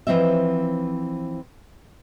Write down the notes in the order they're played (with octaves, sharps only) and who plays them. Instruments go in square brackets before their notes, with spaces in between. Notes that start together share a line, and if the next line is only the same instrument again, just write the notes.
[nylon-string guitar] E3 F3 C4 D#5 E5